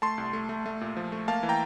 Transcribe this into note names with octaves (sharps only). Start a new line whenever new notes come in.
A3 A5 C6
C2
A3
A3
A3
A#2
F3
A3
A#3 F5 A5
E3
G5 A#5